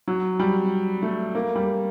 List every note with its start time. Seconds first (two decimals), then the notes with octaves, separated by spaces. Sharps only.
0.08 F#3
0.40 G3
1.02 A3
1.35 A#3
1.55 G3